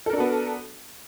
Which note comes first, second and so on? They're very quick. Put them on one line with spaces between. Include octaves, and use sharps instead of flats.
A4 A#4 D4 F#4 B3